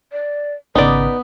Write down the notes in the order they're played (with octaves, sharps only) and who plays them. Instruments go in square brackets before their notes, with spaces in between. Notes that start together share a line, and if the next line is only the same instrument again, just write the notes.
[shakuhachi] D5
[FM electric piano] G#1 C#3 [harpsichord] B3 [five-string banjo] D#4 D5 [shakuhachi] B4